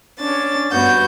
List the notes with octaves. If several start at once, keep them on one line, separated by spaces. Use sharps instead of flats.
C#4 D4 A6
G2 B3 F#4 G6